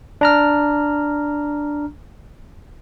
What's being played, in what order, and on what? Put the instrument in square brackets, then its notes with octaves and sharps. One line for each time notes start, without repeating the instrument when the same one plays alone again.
[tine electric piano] D4 A#5 F6